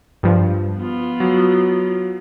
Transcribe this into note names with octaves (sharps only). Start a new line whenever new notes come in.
G2 F3
B3 F4
F#3